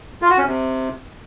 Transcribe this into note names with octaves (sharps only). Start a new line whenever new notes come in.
F4
F#4
C#4
C3